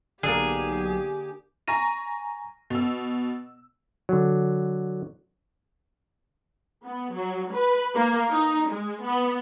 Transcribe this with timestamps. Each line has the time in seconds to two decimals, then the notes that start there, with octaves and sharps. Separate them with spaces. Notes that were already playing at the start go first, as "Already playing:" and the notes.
0.23 B1 D3 A#3 G4 G#4
1.68 G#5 A#5 C#6 A#6 D#7
2.70 B2 E6
4.09 D3 F#3
6.84 B3
7.14 F#3
7.53 B4
7.95 A#3
8.30 D#4
8.70 G#3
9.04 B3